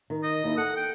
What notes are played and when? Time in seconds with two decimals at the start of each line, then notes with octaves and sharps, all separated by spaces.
0.10 D#3
0.23 D#5
0.44 D#2 D#4 E4
0.57 A4 F#5
0.77 G5